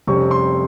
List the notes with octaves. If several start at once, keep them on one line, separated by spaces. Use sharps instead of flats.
F1 F2 C3 G3 C#4 C#6
C6